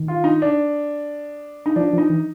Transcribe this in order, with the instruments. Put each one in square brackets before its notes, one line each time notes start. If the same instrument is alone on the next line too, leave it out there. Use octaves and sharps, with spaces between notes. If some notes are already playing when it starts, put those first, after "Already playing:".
Already playing: [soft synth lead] D#3
[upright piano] F4
D#4
D4
D#4
[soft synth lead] F3 [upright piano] D4
[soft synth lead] F3
[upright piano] D#4
[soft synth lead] E3